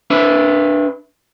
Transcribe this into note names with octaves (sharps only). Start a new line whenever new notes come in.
D4 B4 E5